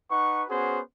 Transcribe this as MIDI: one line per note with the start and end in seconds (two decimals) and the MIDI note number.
0.10 0.43 63
0.10 0.43 71
0.10 0.43 78
0.10 0.43 85
0.49 0.81 59
0.49 0.81 61
0.49 0.81 66
0.49 0.81 68
0.49 0.81 72